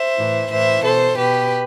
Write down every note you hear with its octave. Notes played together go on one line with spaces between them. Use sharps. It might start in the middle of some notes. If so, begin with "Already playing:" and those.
Already playing: C5 E5
A2 E3
A2 E3 C5 E5
B2 A4 C5
B2 G4 B4